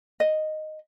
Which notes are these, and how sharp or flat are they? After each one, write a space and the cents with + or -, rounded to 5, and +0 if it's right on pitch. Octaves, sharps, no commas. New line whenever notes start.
D#5 -5